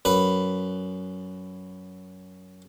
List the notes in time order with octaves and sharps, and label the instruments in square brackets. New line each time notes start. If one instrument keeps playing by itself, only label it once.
[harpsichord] F#2 B4 B5